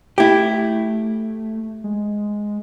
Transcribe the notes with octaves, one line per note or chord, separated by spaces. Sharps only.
A3 E4 G4
G#3